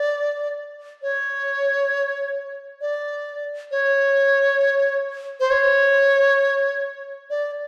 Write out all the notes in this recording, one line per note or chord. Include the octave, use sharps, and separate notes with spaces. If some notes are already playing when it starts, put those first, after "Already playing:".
Already playing: D5
C#5
D5
C#5
C5
C#5
D5